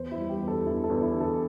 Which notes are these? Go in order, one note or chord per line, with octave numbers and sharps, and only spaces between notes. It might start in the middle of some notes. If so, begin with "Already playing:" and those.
Already playing: E2 C5
E4
G3
G4
E2
A4
E2 E4
A4
E2
E4
D3
A4